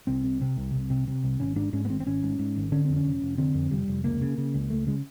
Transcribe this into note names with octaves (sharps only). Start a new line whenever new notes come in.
C2 C4
C3
C3
C2
C2
C3
C3
C2
G#1 C#4
G#2 D4
G#2 C#4
B3
G#1 C4
C4
G#1 C#4
G#2
G#2
G#1
D3 C#4
F2 C4
C#4
F1
F1
D3 C4
F2
F1 G3
F1
C#2 A#3
C#3
C#3
C#2
C#2 A3
C#3 G#3